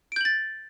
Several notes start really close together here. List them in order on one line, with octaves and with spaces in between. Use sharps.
D7 G6 F#7 A6